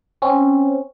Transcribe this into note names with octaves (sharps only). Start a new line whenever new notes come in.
C4 C#4